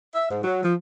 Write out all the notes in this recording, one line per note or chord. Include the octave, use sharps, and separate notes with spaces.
E5
G#2
F#3
F3